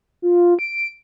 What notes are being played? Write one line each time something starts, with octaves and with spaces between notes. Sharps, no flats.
F4
D7